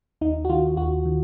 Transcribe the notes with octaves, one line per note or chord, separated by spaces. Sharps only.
D#2 D#4
F#4
D#3 F4
D#2 F#4
D#3